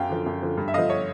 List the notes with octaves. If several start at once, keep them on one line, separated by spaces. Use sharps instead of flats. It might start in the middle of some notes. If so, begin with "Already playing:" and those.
Already playing: F#2 F5 G5
D3 F3
F#2
D3 F3
G2
E5
D3 F3 D#5 F5
C#5